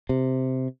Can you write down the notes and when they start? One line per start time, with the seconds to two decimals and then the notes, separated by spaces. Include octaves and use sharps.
0.09 C3